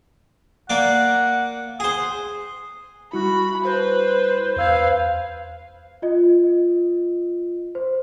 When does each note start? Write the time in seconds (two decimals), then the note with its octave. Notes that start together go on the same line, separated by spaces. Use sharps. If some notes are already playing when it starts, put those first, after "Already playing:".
0.70 A#3 D5 F#5
1.80 G#4 C5 D#6
3.13 G3 E4 F#4 B5
3.65 B4 C5
4.56 E2 B4 F5 E6 G#6
6.02 F4 D#5
7.75 C5